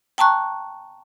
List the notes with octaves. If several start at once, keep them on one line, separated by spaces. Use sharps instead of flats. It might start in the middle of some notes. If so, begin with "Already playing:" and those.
G5 A5 A#5 C#6 F#6